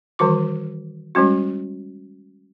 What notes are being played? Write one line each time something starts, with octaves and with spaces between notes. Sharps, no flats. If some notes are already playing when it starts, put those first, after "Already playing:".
D#3 E3 G3 F#4 D6
G3 G#3 C#4 F#4